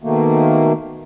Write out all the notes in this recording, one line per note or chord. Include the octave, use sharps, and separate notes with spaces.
B2 D#3 A3 A#3